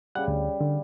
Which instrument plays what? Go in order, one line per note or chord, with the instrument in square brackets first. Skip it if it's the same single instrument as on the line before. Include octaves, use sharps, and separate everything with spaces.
[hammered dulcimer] C#3 G3 [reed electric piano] F#5 F#6
[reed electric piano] D2
D3